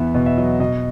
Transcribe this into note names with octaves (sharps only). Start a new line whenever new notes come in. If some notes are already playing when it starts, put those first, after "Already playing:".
Already playing: E2 E3 B3 E5
B2 D#5
E5
F#3 D#5
B2 D#5